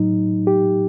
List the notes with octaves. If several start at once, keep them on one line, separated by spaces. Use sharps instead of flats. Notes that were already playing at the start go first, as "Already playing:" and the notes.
Already playing: A2 F#3 D#4
G4